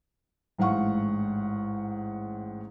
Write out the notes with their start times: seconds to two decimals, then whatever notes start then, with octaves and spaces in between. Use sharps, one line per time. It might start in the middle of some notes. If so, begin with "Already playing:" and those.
0.58 A1 G#2 F5 F#5 C#6